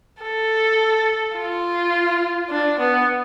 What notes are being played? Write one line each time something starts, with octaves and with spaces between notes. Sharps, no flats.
A4
F4
D4
B3